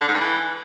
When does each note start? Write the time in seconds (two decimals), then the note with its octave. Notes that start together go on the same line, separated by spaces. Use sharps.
0.01 D3
0.08 G#2
0.14 G2
0.21 E3